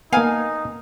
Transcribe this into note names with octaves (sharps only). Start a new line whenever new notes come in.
A#3 B3 D#4 F5 G#5